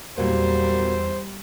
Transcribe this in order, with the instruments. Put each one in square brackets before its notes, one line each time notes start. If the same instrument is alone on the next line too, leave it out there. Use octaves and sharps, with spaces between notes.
[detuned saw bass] E2 [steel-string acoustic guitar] A#2 F#3 A#3 [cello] G3 [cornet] C5